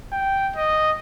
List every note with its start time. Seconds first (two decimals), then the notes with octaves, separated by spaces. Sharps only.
0.12 G5
0.56 D#5